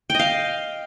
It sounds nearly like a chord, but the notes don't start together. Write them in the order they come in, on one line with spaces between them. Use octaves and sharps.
G5 D#5 F5